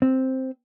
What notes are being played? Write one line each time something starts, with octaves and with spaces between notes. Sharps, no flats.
C4